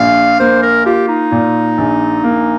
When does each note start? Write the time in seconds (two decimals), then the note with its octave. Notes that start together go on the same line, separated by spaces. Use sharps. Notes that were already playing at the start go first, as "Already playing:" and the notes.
Already playing: A#1 A#2 F5
0.40 A#3 C5
0.63 A#4
0.86 F4 G4
1.08 D#4
1.32 A#2
1.78 A#1
2.24 A#3